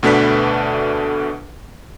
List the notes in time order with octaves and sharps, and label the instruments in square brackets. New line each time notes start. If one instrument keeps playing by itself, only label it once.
[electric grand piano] D2 B2 A3 D4 B4 B6